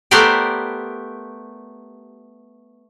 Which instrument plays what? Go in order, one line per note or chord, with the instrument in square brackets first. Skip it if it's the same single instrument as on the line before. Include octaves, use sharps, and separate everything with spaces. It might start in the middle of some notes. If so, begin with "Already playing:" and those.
[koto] A3 B3 G4 A#4 C5 D5